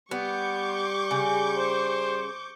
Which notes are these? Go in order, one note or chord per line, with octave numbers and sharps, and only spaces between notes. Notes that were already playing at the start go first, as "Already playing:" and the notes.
G3 B3 C#6 D6 G6
C#3
C5